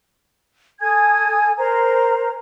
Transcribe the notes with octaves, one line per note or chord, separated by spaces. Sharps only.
A4 G#5 D#6 G#6
A#4 C5 A#5